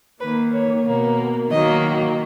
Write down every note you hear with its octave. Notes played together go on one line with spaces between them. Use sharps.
D#3 A#3 B4
C#5
B2 A#3
D#3 F#3 A#3 D#5